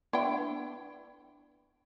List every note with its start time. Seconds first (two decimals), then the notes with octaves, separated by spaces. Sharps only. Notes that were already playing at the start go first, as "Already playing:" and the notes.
0.13 B3 D4 E4 G5